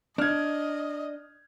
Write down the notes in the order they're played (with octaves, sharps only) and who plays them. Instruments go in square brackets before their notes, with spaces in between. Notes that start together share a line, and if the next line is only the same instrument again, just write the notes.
[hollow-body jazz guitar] D4 [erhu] D#5 [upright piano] F6 G#6